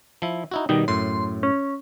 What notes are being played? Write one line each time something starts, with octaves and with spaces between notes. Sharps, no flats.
F3 E4
D#4 E4 F#4
B2 D#3 G3 D#4
F#2 A2 C6
C#4